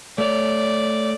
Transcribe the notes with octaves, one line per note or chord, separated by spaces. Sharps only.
A3 C#5 D5